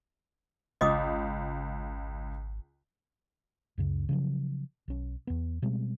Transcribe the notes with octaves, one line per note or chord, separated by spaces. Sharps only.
G#1 C#2 D#5 D6 D#6
C#2 F#2 C#3
C#3 F3 F#3
B1 C#4
E2 B3
B2 G3 G#3 C4